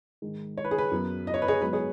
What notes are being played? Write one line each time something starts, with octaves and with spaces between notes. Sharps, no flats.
G#2 D#3 G#3
C#5
B4
G#4
B4
F#2 F#3 B3
D#5
C#5
B4
G#4 C#5
G#2 F#3 B3 B4
G#4 C#5